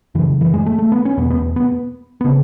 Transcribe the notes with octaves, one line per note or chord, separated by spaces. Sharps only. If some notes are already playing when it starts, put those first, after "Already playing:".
F#2 C#3 E3
E3
G#3
A3
A3
B3
C#4
E2 B2 B3
B3
B3
C#3 B3